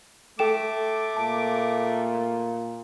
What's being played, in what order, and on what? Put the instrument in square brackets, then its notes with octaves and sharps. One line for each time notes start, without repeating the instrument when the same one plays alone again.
[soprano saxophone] A3 [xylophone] A4 G5 E7 [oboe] D6
[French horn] A#2 [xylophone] A5